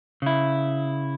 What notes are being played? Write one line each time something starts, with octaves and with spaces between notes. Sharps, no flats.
C#3 E4